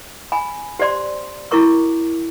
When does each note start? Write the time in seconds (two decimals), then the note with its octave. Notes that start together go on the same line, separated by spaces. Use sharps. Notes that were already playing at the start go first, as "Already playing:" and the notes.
0.32 G#5 B5
0.79 G4 C5 D5 C6
1.51 E4 F#4 A#4 C#6 D6